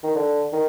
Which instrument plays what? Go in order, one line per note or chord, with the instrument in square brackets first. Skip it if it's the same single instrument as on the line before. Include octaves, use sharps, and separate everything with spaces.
[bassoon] D#3
D3
D#3